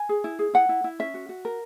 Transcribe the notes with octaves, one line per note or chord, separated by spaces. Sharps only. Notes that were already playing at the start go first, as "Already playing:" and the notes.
Already playing: G#5
G#4
E4
G#4
E4 F#5
E4
E4
C#4 E5
F#4
F#4
A#4